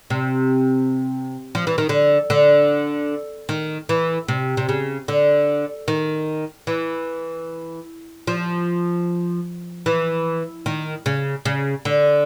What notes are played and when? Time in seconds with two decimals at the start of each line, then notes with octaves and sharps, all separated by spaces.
0.10 C3
1.55 F3
1.67 E3
1.78 D#3
1.89 D3
2.30 D3
3.49 D#3
3.89 E3
4.28 C3
4.57 C3
4.69 C#3
5.08 D3
5.88 D#3
6.67 E3
8.27 F3
9.86 E3
10.66 D#3
11.06 C#3
11.45 C#3
11.85 D3